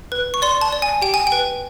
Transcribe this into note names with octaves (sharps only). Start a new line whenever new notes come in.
B4
C#6
D5 C6
A5
D5
G#5
G4 G5
G#5
G5
B4